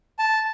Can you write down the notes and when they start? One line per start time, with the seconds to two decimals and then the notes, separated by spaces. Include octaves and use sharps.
0.19 A5